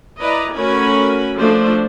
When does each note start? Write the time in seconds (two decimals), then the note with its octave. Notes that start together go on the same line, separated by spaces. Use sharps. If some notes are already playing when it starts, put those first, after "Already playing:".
0.21 E4 B4 D5 D#5 A#5
0.56 A3 C#4 F#4 A#4 G#5 B5
1.37 F3 A3 D4 C5